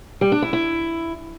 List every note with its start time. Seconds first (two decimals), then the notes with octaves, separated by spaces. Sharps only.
0.21 G3
0.32 D4
0.42 E4
0.53 E4